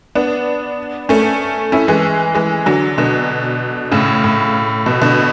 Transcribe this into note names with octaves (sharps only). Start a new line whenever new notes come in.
B3 D4
A3 C#4
C#4 E4
E3 G#3
E3 G#3
D3 F#3
B2 D3
A2 C#3
A2
B2
B2 D3